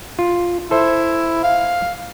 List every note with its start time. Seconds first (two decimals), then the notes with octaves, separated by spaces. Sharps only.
0.19 F4
0.71 E4 A4 C5
1.44 F5